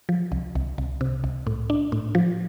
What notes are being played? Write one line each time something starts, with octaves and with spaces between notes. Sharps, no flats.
F3
C2
C2
C2
C3
C2
A2
D4
A2
F3